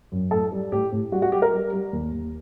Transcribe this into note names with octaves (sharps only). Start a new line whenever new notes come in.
F#2
A2 A4
G3
A2 G4
A2
G3 F#4
F#4
G3 G4
A#4
G3
G3
D#2
D#2